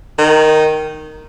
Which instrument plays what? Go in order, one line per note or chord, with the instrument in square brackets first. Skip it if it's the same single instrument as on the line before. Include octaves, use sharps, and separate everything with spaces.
[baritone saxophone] D#3